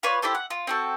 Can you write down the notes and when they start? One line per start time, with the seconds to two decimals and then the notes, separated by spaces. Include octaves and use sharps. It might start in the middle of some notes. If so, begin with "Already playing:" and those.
0.03 F4 B4 C#5 D5
0.22 E4 G4 A4 C5
0.35 F#5
0.50 F4
0.67 C4 F#4 A4